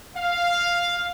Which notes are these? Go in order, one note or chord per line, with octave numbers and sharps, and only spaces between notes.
F5